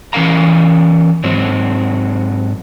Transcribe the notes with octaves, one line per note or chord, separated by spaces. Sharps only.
E3 C#4 A#4 F5 A#5
G#2 F#3 C4